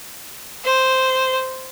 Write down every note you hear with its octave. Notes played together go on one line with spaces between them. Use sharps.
C5